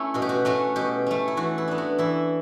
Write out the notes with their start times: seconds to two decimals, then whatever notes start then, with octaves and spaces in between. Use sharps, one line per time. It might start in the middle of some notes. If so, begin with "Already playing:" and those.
Already playing: A3 C#4 E4
0.14 B2 F#4
0.22 G4
0.29 F#4
0.45 A3 C#4 F#4
0.76 B2 G4
1.06 A3 C#4
1.28 E4
1.37 E3 F#4
1.58 E4
1.68 B3 D4
1.78 F#4
1.98 E3 E4